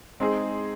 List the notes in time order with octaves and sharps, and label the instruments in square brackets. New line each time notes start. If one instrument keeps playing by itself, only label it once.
[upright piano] G#3 C4 D#4 G#4